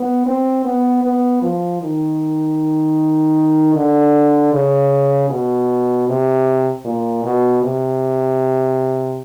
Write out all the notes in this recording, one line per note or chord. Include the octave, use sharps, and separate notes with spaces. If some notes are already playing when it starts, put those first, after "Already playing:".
Already playing: B3
C4
B3
B3
F3
D#3
D3
C#3
B2
C3
A#2
B2
C3